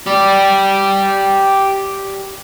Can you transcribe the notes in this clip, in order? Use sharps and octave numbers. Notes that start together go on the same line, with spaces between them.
G4 D5